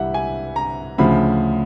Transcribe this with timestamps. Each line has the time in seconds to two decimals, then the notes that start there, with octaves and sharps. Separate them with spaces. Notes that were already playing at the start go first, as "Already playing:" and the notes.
Already playing: C2 E3 G3 E5 F#5
0.14 G#5
0.56 A#5
0.98 D2 C#3 F3 B5